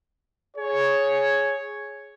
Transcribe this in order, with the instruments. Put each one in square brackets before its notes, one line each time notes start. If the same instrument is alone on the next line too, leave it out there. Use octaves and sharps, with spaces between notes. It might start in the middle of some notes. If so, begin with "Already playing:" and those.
[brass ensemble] G#4 C#5